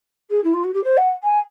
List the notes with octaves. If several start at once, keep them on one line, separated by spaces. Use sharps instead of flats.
G#4
E4
F4
F#4
G4
C5
F#5
G#5